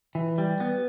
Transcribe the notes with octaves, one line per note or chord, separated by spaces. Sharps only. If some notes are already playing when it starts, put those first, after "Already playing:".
E3
G3
B3